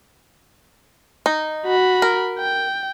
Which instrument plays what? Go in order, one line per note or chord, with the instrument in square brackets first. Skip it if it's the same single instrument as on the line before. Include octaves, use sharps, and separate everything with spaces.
[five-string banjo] D#4
[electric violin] F#4 B5
[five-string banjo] A#4
[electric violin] G5